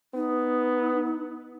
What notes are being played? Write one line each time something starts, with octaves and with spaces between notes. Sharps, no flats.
B3 D#4